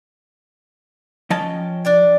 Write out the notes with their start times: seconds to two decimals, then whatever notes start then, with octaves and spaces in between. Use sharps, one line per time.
1.30 F3 C#4 D#5 G5 A5
1.85 D4 D5 G5